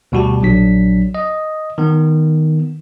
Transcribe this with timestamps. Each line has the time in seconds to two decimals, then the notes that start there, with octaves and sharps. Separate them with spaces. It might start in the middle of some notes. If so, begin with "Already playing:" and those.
0.12 D2 B2 G3 F#4 G4 A5
0.42 A#1 F#3 D4 B6
1.15 D#5
1.78 D#3 B3